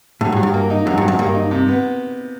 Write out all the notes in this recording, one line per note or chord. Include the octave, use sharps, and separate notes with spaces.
A2 F#3
G2
F#3
G2
A#3
D#4
F#2 F#3
G2
F#3
F#2
G2 A#3
D#4
C3
B3